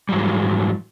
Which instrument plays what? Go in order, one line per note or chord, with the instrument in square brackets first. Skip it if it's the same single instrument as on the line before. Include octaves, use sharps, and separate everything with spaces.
[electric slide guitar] G#2 C3 E3 F#3 G3